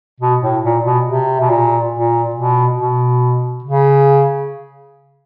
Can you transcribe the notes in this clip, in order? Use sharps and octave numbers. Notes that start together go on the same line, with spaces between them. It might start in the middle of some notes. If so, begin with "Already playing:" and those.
B2
A2
A#2
B2
C3
B2
A#2
A#2
B2
B2
C#3